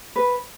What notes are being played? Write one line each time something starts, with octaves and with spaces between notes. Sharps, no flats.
B4